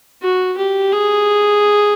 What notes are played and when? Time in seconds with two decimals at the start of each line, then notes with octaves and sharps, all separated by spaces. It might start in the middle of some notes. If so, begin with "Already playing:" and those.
0.22 F#4
0.57 G4
0.92 G#4